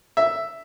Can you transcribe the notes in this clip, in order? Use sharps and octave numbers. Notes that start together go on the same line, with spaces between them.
E5